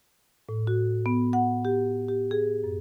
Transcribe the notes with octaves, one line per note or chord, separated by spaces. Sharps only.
A2
F#4
B3
F#5
G4
G4
G#4
F#2